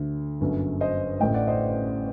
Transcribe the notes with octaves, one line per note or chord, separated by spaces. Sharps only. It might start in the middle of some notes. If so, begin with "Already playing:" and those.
Already playing: D2 D3
G1 F#2 D3
C5 D#5
A1 A2 D#5 G5
D5 F#5
C5 D#5